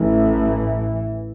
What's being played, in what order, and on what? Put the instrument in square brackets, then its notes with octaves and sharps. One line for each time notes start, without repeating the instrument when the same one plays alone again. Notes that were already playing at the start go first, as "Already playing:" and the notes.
Already playing: [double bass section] A1 A2 E3